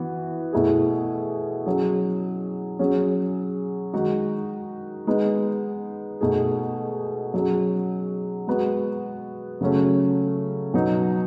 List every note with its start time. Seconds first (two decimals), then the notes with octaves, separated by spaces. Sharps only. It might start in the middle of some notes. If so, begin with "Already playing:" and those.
Already playing: E3 B3 F#4
0.53 B2 A3 E4 G#4
1.66 F#3 C#4 G#4
2.79 F#3 C#4 G#4
3.93 D#3 G#3 D#4 F#4
5.07 G#3 B3 D#4
6.21 B2 A3 D#4 G#4
7.34 F#3 C#4 G#4
8.48 G#3 B3 F#4
9.61 C#3 F#3 A3 C#4
10.74 B2 F#3 B3 D#4